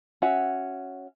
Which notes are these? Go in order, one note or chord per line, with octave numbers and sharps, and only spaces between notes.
C#4 F#4 E5 F#5